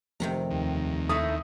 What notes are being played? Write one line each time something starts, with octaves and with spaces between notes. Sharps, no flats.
F1 C3 D#3 A#5
D#2
A3 D#4 E4 D#6